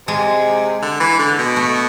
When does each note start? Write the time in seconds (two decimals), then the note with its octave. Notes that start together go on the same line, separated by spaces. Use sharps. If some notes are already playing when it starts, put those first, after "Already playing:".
0.07 C3 G#3
0.82 D3
1.00 E3
1.19 D3
1.38 B2
1.56 A3